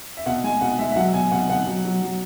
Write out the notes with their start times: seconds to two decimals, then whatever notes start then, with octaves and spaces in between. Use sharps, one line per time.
0.17 E5
0.26 B2 F#5
0.44 G#3 G#5
0.61 B2 F#5
0.79 G#3 E5
0.92 E5
0.96 F#3 F#5
1.14 B2 G#5
1.31 B2 F#5
1.49 B2 F#5
1.67 F#3
1.85 F#3
2.02 F#3